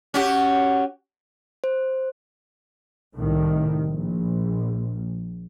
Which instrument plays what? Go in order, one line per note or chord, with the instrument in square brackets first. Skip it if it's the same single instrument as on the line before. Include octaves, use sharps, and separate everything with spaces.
[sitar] C#4 F#4 G4
[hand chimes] C5
[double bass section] C2 A2 D#3
A#1